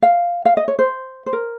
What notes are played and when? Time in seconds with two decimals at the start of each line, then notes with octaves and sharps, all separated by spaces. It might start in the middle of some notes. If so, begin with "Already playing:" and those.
0.02 F5
0.45 F5
0.57 D#5
0.68 C#5
0.79 C5
1.26 C5
1.33 A#4